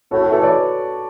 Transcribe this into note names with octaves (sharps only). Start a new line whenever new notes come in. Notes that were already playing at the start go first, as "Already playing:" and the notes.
A2 F#4 A4
F#4 A4
E3 A3 A4 C#5
B4 D5